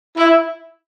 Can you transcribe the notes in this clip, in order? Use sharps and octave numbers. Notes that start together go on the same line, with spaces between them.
E4